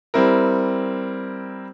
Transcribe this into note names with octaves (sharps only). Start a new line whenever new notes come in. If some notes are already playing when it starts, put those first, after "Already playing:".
G3 C4 E4 A#4